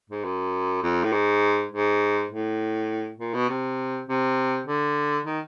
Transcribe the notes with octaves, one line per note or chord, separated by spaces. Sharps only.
G#2
F#2
F2
A2
G#2
G#2
A2
A#2
B2
C3
C3
D3
D#3